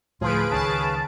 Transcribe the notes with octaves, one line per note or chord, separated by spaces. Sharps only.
D2 A2 F3 F4 G#4 B4 D7
C#2 D#3 C#4 F5 A5